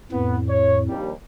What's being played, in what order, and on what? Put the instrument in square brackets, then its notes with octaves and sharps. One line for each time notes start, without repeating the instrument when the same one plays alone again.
[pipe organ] F2 A2 [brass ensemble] B3
[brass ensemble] C#5
A#1 D#2 G3